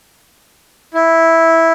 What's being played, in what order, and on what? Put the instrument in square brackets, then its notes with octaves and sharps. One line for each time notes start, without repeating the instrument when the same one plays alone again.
[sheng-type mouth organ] E4